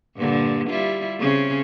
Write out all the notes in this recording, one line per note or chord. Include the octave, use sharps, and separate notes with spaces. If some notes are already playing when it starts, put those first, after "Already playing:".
G2 A#2 D3
G3 E4 F4
C#3 C4 C#4